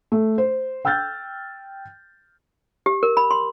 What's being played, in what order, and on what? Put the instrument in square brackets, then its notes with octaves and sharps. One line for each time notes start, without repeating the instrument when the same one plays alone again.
[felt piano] A3
C5
G5 E6 F6 G6 A6
[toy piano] G4
A#4
B5
C6